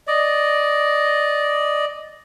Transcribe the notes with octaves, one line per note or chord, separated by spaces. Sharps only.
D5 D#5